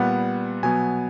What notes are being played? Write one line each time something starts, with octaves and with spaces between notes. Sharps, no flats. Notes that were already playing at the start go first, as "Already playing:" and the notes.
Already playing: A#2 G3 B3 F#5
B2 F#3 B3 G#5